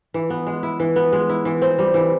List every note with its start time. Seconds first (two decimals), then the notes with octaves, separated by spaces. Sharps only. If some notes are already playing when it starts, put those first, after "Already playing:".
0.14 E3
0.30 B3
0.47 G#3
0.63 E4
0.80 E3
0.96 B3
1.12 G#3
1.29 E4
1.45 E3
1.62 C4
1.79 G3
1.94 E3